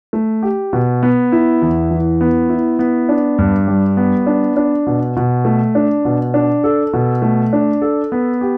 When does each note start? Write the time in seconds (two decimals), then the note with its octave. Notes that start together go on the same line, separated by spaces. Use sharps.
0.13 A3
0.43 G4
0.73 B2
1.03 B3
1.32 E4
1.62 E2
1.91 E3
2.21 B3
2.49 E4
2.79 B3
3.09 D4
3.38 G2
3.68 G3
3.97 B3
4.27 D4
4.57 D4
4.87 B2
5.16 B2
5.45 A3
5.75 D4
6.05 B2
6.34 D4
6.64 A4
6.93 B2
7.22 A3
7.53 D4
7.82 A4
8.12 B3
8.41 G4